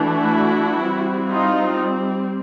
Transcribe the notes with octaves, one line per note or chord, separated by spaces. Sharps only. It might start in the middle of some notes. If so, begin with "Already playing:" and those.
Already playing: E3 A3 D4 E4 F#4
G3 C4
D#4 F4